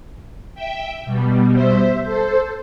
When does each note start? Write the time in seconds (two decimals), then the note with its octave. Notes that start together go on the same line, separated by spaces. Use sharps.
0.55 E5 G5
1.05 B2 G3
1.54 C5 E5
2.04 A4 C5